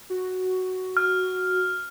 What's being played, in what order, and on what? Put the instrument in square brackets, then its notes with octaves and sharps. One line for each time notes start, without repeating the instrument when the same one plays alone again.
[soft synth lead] F#4
[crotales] F6